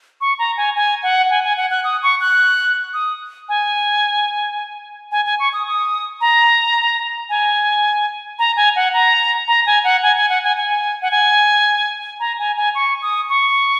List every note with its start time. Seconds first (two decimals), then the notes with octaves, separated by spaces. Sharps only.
0.21 C#6
0.39 A#5
0.57 G#5
0.76 G#5
1.03 F#5
1.30 G#5
1.44 G#5
1.57 F#5
1.71 F#6
1.84 D#6
2.03 C#6
2.21 F#6
2.94 D#6
3.49 G#5
5.12 G#5
5.25 G#5
5.39 C#6
5.53 D#6
5.67 D#6
6.21 A#5
7.30 G#5
8.39 A#5
8.57 G#5
8.76 F#5
8.94 A#5
9.48 A#5
9.66 G#5
9.84 F#5
10.03 G#5
10.17 G#5
10.29 F#5
10.44 G#5
10.57 G#5
11.02 F#5
11.11 G#5
12.20 A#5
12.39 G#5
12.57 G#5
12.75 C#6
13.02 D#6
13.30 C#6